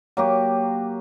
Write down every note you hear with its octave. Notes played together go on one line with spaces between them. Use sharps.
F#3 A#3 G4